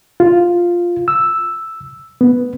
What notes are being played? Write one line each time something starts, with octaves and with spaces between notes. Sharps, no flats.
F4
E6
B3